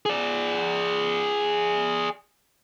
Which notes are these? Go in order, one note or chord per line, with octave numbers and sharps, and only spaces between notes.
G#4 D5